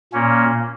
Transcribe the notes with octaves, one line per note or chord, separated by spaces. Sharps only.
A#2 A#3 C#4